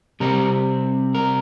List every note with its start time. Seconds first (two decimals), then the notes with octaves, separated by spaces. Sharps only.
0.20 C3 G3 C4 A#4
1.15 A#4